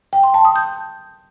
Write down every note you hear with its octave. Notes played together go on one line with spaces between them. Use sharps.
G5
C6
A5
D#6
G6